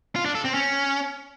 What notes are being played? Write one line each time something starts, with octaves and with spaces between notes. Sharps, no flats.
F4
D4
A4
C4
C#4